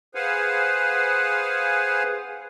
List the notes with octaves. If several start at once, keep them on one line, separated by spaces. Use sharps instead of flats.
G#4 B4 C5 F5 F#5 G#5